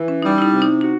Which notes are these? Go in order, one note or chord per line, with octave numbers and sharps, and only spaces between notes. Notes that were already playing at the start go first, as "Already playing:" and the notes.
Already playing: E3
C#4
G3 D#4
E4
D#4
C3
D#4
D#4 F#4